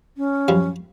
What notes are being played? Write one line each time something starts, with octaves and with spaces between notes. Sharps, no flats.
C#4
F#2 F3 G3